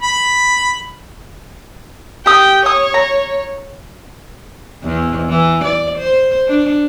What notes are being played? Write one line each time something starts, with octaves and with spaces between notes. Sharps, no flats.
B5
G4 G5 D#6
C#5 D#6
A#5
E2
E3
D5
C5
D4